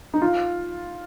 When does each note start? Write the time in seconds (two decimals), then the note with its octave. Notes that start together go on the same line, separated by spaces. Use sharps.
0.14 D#4
0.22 F4